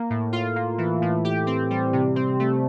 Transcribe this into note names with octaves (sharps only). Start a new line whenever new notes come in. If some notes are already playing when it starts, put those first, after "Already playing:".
Already playing: A#3
A2
F4
A#3
E3
A2
G4
C4
G3
C3
C4
A3